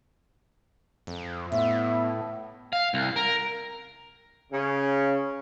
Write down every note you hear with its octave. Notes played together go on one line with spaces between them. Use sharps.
F2
A2 B3 E5
F5
C2
A#4
C#3